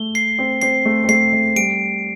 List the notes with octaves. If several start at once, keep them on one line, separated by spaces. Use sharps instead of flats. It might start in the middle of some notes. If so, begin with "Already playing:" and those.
Already playing: A3 G7
C7
C4
C4 C7
A3
C4
A3 C7
A3
G3 D7